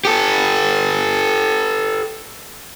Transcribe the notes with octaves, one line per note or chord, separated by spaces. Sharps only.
G4 A4